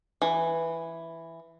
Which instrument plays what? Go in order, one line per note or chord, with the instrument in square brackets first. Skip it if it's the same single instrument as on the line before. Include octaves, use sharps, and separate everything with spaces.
[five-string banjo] E3